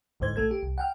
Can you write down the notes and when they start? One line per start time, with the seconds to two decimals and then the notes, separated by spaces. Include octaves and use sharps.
0.20 A1 D2 G#2 C5 G#6
0.36 A#1 A3 A4 G#6
0.51 G4
0.63 C2
0.78 F#5 G5 F6